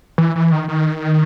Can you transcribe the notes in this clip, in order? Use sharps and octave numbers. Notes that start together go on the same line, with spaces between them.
E3
E3
D#3
D#3